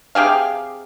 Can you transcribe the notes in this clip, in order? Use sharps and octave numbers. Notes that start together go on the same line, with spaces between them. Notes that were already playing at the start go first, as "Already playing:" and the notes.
C3 G4 G#4 F5